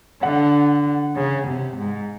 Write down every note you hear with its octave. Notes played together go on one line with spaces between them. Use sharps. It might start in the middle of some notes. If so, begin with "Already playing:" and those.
D3 F#5
C#3
C3
G#2